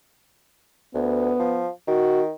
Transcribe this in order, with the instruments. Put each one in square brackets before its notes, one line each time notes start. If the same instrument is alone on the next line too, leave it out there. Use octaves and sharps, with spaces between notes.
[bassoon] D2 [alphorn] B3
[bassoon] F3
[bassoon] D#3 [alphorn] F#4